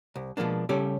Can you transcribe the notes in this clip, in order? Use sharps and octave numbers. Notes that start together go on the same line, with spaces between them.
C2
B2 F3 G#3 A#3 D4
C#3 G3 C#4 G4 A4 D5